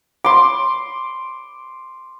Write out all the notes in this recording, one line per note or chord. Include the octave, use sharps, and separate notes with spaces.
C6 D6